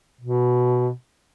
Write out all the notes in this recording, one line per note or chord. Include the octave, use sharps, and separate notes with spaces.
B2